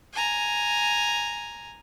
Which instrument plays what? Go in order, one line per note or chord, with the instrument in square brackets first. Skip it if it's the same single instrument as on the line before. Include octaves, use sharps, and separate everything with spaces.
[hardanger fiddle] G#5 A#5